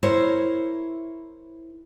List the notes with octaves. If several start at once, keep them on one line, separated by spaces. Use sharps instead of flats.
E4 A#4 C5 C#5